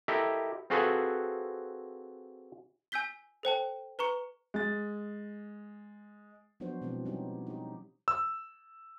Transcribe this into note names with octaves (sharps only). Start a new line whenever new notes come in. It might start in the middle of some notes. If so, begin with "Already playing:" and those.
E4 G4 A4 A#4 D#5 E5
C4 F4 F#4 G#4 A4 B4
G#5 E6 G6 B6 G7
A4 C5 G5 A5
B4 A#5 C#6 C#7
G#3 A6
F3 F#3 B3 D4 F#4 C5
B2 E3 G#3 B3 C4
G3 C#4 D#4 G4
D#4 G4
E6